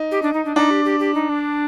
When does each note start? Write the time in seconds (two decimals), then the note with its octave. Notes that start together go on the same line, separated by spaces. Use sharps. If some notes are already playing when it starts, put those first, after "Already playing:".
Already playing: D#4
0.11 G4
0.22 D4
0.33 D#4
0.45 D4
0.56 D4 D#4
0.70 G4
0.85 G4
1.00 G4
1.14 D#4
1.29 D4